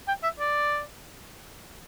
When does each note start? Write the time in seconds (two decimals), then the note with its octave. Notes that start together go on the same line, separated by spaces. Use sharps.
0.08 G5
0.23 E5
0.40 D5